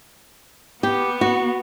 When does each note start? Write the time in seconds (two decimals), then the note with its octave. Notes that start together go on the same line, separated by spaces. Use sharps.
0.83 B3 G4
1.21 F#4